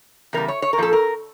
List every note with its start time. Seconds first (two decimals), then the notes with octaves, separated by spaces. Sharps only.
0.33 E2 C#3 G3 A#4
0.48 C#5
0.62 C#5
0.73 A#4
0.78 A#2 F3 A4
0.93 A#4